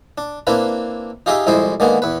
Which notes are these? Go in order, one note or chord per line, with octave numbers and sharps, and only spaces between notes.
D4
A#3 C4 D4 E4 B4
D#4 F4 G4 G#4 D#5 E5
C2 F2 G#3 E4 C5 D#5
D3 D#3 G#3 A#3 B3
E2 B4